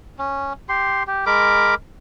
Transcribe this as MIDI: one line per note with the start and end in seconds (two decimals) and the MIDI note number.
0.19 0.53 61
0.69 1.03 67
0.69 1.03 84
1.07 1.25 67
1.26 1.75 56
1.26 1.75 70
1.26 1.75 83
1.26 1.75 86